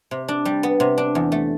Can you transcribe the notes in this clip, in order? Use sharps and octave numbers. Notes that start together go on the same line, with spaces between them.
C3
D4
G3
B3
C3
D4
E2
A3